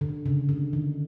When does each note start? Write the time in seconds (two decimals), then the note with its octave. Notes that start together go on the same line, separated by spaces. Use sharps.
0.01 D3
0.26 C#3
0.49 D3
0.73 D#3